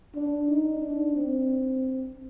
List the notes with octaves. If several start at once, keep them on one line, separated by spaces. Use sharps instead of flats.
D4
D#4
D4
C4